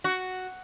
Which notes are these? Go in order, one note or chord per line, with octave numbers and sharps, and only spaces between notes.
F#4